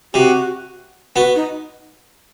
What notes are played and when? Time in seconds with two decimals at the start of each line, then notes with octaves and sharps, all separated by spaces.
0.14 C3 F#4
1.16 B3 F#4
1.36 D#4